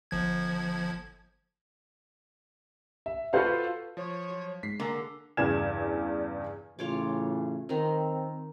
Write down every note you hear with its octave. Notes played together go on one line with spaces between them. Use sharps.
G1 F3 G#6
E5
F4 F#4 A4 B4 C5 F5
F3 C#5
F#3
G#2 B6 C7
D3 A#3 G#4 A#5
E2 G2 C#3 D5 G#6 E7
A2 C#3 E3 F4 C#5 D6
D#3 C4 A#4